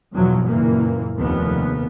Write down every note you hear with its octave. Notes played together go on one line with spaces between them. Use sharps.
E2 G2 B2 F3 F#3
F#1 A#2 E3 A#3
F1 D#2 A#2 B3